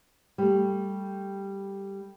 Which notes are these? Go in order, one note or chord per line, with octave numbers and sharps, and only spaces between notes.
G3 A3